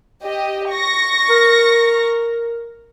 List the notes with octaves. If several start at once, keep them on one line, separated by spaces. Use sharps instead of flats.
G4 D#5
C#6 A#6
A#4